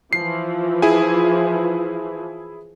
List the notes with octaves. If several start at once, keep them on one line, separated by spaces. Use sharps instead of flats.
E3 F3 C7
E4 G#4 G#5